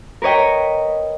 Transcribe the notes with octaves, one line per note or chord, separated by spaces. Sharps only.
A#4 B4 C#5 D#5 G5